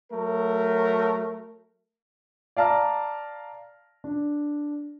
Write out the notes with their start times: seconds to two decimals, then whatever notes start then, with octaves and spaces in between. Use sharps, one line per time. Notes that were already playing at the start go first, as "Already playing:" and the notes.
0.12 F#3 A3 A#4
2.57 D5 F5 A5 A#5 F6
4.04 D4